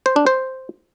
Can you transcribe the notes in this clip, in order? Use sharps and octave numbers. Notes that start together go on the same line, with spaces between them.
C5
D4
C5